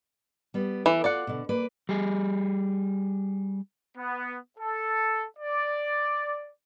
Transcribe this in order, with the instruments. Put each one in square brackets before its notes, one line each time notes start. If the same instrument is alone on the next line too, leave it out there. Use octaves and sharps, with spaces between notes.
[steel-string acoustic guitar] G3 B3
[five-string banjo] E3 [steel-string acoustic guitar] A4
[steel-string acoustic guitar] F4 F#4 [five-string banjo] D5 F#5
[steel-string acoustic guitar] B2 D3
A#3 B4 D5
[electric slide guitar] G3 G#4
[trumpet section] B3
A4
D5